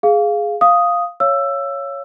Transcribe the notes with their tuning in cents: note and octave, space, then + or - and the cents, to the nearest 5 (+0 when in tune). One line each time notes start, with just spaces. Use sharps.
G#4 +5 F5 +0
F5 +0 D#6 +0
C#5 +0 F5 -25 E6 +15